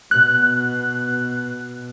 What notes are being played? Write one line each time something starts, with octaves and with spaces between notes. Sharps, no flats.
B2 F#6